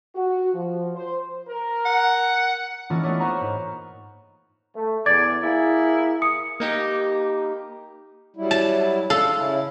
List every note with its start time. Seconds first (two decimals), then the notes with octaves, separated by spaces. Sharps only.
0.15 F#4
0.53 F3
0.95 C5
1.48 A#4
1.85 F#5
2.90 E3 G#3 A#3 C#4 D4 F4
3.03 A3 B3 D4 D#4 C#5
3.20 B4 C5 F5 F#5 A#5 C#6
3.41 G#2
4.74 A3
5.06 E2 D5 D6 G#6 A6
5.43 A#3 E4 G#4
6.22 D#6 C#7
6.60 A#3 D#4 G4
8.37 F#3 G3 E4
8.51 A5
9.10 D4 F4 A4 F5
9.36 C#3 C#4 E4